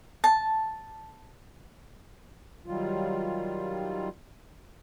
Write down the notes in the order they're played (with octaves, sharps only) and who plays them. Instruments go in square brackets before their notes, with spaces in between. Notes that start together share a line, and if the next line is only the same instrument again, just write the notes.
[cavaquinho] A5
[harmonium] D#3 F#3 G3 F4